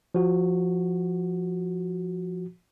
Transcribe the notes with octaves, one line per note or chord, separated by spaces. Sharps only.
F3 F#4